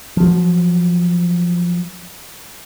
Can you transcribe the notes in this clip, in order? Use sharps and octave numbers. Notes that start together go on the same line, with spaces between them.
F3 F#3